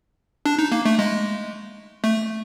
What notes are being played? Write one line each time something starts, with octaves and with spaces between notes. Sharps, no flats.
D4
D#4
A#3
A3
G#3
A3